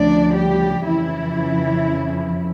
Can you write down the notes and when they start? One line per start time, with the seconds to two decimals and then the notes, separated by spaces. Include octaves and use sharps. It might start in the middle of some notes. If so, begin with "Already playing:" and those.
Already playing: D2 C#3 F3 D4 D5
0.35 G3 G4
0.85 F2 C#3 E3 F3 E4